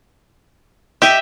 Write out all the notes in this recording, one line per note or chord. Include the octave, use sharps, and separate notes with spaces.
G4 D#5 E5